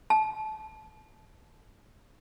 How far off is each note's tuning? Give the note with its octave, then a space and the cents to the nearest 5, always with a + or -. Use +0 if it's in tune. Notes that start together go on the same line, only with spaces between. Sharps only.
A5 -25